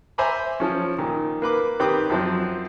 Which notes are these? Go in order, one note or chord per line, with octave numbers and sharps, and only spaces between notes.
C5 E5 G#5 A#5 B5 D6
F3 C#4
A#2 D#3
A#3 B4 D6
D#3 C4 G4 B4 D6 D#6
F#2 F3 C4